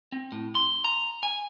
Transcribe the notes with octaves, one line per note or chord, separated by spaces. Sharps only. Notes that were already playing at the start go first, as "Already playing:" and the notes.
C4
A2
C6
A#5
G#5